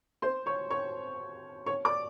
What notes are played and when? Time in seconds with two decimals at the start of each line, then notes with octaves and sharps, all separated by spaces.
0.22 C5 C6
0.46 C#5 C#6
0.70 C#5 C#6
1.66 C#5 C#6
1.85 D5 D6